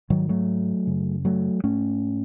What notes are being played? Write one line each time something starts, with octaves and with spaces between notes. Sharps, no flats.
G#2 D#3 F#3
F#3 A3
F#2 C#3
F#3 A3
G#2 A3 C#4